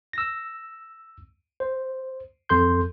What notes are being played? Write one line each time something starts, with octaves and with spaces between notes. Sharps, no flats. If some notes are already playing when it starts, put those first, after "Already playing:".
E6 A#6
C5
F2 A4 C6 G6